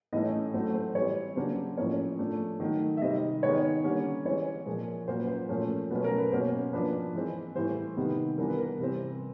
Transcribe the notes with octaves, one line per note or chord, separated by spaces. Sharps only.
A2 E3 A3 C#4 D#5
A2 F#3 A3 C4
C5
E3 G3 C4 C#5
C#3 F#3 A#3 D4 C5
A2 F3 A#3 C#4 C#5
F3 A3 D4
D#3 F#3 A3
E5
C3 D#3 G3 C4 D#5
D#3 G#3 B3 C#5
D3 G3 A#3 C#4
E3 G#3 C4 C#5
A#2 F3 G#3
A#2 F#3 A#3 C#4 C5
B4
C5
A#2 F3 A3 C#4
B2 F#3 A3 C#4 B4
A#4
B4
B2 F#3 A#3 C#4 C5
F3 A#3 D4 B4
E3 G#3 C4
A2 E3 G3 C5
C3 D#3 G3 B3
E3 G3 B3 D4 A#4
B4
A#4
C3 E3 G3 C4